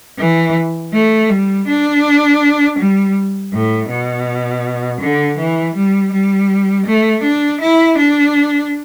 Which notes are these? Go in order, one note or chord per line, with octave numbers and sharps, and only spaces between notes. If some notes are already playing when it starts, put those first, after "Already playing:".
E3
A3
G3
D4
G3
A2
B2
D3
E3
G3
G3
A3
D4
E4
D4